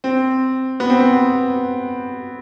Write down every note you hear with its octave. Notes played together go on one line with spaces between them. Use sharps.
C4
B3
C4
B3